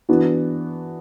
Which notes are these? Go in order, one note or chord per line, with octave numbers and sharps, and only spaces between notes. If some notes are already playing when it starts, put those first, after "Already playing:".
E3 B3 D4 F#4